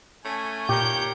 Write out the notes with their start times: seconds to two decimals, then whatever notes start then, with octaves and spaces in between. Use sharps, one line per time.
0.24 A3 C#4 G#5
0.69 A#2 D#3 G4 A#4 C#5 G6